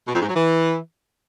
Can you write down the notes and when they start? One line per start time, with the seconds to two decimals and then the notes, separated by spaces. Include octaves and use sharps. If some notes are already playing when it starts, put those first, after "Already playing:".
0.08 B2
0.15 F2
0.22 G#2
0.29 F#3
0.36 E3